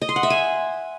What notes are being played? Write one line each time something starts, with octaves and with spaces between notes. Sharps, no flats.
D#5
C6
F#5
E5
G#5